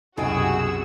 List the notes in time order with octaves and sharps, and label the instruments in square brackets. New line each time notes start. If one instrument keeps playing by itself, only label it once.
[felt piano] C2 F#2 [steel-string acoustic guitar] B2 G5 G#5 [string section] F#4 E6 [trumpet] G#4